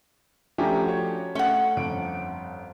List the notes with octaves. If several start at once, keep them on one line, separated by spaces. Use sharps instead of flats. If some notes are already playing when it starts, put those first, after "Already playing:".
F3 A3 C#4 D4 G4 A#5
F#4 C#5
A3 C#4 F#5
G1 F2 D7